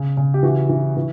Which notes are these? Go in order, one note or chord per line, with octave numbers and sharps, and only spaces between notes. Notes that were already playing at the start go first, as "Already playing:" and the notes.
Already playing: C#3
C#3
G4
E3 F#4
E3
E3